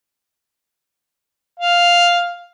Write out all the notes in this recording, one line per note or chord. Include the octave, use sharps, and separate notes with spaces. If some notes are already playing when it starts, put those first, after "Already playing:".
F5